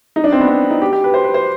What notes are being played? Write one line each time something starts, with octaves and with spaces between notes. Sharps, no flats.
D#4
D4
C4
B3
C4
D#4
G4
G4
B4
C5
B4
C5